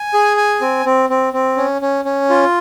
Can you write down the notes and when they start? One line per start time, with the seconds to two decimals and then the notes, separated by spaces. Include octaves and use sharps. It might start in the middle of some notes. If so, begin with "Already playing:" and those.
Already playing: G#5
0.14 G#4
0.37 G#5
0.61 C4
0.85 C4
1.10 C4
1.33 C4
1.57 C#4
1.82 C#4
2.05 C#4
2.30 F4